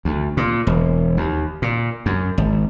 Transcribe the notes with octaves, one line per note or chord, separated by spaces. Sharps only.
D2
A#2
E1
D#2
A#2
F#2
G#1